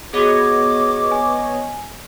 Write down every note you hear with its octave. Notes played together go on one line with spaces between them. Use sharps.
B3 F#4 G#4 C#5 D#5 D6
G#5